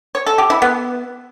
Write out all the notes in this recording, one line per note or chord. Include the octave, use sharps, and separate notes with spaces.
C#5
A4
G4
E4
B3